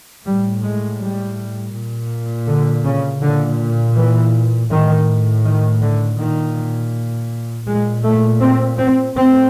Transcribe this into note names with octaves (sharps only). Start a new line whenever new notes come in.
A2 G3
G#3
G3
A#2
D3
C#3
A#2 D3
E3
A2 D#3
D#3
D3
A#2 D#3
A#2 G#3
A3
C4
C4
A2 C4